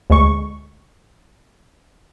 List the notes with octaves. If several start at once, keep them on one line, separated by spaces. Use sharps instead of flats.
D2 G#3 C#6